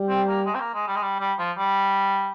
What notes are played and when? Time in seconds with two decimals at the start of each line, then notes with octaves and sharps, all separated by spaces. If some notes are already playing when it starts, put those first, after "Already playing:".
Already playing: G3
0.09 C4
0.28 A#3
0.46 G#3
0.54 C4
0.60 A#3
0.74 G#3
0.87 G3
0.96 G#3
1.02 G3
1.20 G3
1.38 F3
1.57 G3